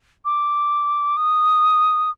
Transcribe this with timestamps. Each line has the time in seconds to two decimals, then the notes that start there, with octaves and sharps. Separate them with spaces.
0.25 D6
1.17 D#6